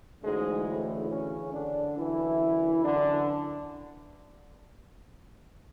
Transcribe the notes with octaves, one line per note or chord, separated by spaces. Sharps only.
D2 G#2 C#3 E3 G#3
A2 A3
C#3 C#4
D3 D4
F#2 D3 E3 E4
D3 D4